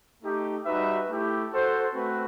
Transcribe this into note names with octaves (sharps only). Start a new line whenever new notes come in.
A3 D#4 G4
G3 D#4 F#4 B4 E5
A3 E4 G4
F#4 A4 C5
A3 C4 F#4 B4